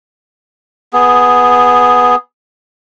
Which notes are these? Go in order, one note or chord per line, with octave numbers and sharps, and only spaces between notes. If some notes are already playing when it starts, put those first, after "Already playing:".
B3 G#4